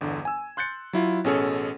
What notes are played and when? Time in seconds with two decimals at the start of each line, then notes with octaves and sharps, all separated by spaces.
0.01 G1 E2 D3
0.25 G#5 E6
0.57 C6 F#6 G6 A6 C#7
0.93 F#3 E4 F4
1.24 A1 B2 C#4 G#4 A4 C#5